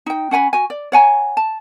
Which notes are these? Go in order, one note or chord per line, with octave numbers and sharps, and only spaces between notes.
D#4 G5
C#4 F#5 G#5 B5
F#4 G#5
D5
C#5 F#5 G#5 A#5
A5